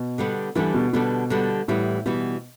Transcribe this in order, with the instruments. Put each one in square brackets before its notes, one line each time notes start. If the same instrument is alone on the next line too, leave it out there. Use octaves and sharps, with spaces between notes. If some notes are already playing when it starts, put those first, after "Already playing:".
Already playing: [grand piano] B2
[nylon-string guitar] D3 G3 B3 D4
[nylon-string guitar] D3 G3 B3 D4 [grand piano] E3
[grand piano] B2
[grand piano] B2 [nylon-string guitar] D3 G3 B3 D4
[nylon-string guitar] D3 G3 B3 D4
[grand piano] A2 [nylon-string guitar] E3 G3 B3
[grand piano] B2 [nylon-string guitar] E3 G3 B3